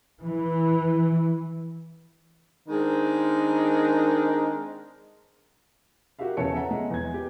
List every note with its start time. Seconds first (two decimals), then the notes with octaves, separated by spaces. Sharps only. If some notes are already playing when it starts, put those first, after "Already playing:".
0.24 E3
2.68 D#3 G#3 C4 D4 D#4 A#4
6.19 F#4 G4 A#4 E5 F5
6.37 E2 C#3 A4 C#5 C#7
6.55 E5 F#5 A#5
6.71 G#3
6.90 E2 G#6
7.12 B3 G4